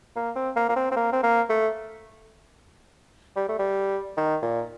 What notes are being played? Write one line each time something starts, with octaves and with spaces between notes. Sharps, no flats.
A#3
C4
A#3
A#3
C4
C4
A#3
C4
A#3
A3
G3
A3
G3
D#3
A#2